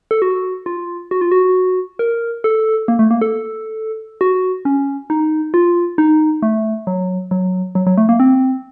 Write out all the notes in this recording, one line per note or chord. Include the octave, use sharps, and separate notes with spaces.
A4
F#4
F4
F#4
F4
F#4
A#4
A4
A#3
A3
A#3
A4
F#4
C#4
D#4
F4
D#4
A3
F#3
F#3
F#3
F#3
A3
A#3
C4